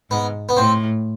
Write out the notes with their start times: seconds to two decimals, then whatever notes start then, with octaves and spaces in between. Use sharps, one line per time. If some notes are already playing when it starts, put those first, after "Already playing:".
0.11 G#2 B3
0.49 B3
0.57 A2 C4